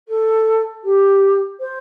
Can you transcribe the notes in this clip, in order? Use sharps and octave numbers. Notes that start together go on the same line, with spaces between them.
A4
G4
C5